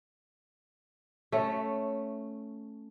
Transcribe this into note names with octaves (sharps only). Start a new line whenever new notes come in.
A3 C#4